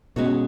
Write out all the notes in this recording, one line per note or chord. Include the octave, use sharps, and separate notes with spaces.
B2 G#3 C#4 F#4 C#5